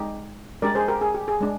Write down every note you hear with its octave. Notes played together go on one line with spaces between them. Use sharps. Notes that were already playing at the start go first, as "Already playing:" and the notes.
Already playing: G#3 D#4 G4
G#3 D4 G4 A#4 D5
G#4 C5
G4 A#4
G#4
G4
G#4
G#3 D4